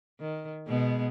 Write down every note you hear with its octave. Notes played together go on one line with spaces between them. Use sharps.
D#3
B2 G#3 B3